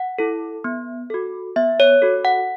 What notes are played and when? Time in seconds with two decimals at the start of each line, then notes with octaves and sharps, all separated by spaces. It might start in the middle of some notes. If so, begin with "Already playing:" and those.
Already playing: F#5
0.18 E4 A4
0.64 B3
1.10 F#4 A4
1.56 B3 E5
1.80 C#5
2.02 F#4 A4
2.25 F#5